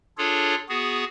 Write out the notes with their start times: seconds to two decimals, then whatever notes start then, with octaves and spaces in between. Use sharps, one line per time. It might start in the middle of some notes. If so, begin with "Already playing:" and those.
0.18 D4 F4 G#4 A4 C#5
0.69 B3 F#4 G#4